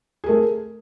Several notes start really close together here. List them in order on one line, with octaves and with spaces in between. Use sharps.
G#4 A#4 A3